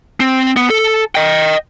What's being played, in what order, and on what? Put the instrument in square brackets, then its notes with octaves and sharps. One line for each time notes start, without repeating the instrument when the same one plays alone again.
[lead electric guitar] C4
B3
A4
D#5 G5